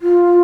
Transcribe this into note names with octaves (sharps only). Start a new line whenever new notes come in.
F4